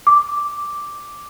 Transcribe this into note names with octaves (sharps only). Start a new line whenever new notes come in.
D6